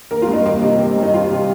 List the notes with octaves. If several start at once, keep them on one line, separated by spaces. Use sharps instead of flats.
A#3 A#4
F4
G2
D#4
A#3
C3
A#3
G2
D#4
G3 F4
C3